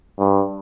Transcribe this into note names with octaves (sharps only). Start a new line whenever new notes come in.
G2